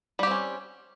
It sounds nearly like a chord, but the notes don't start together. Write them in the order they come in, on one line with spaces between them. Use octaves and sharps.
G3 G4 C4 C#4